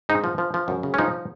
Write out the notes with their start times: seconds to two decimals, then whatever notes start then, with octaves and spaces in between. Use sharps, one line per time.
0.09 G#2 D#4
0.24 F3
0.38 F3
0.54 F3
0.68 F#2
0.83 C#3
0.94 C#4
0.98 F3 D#4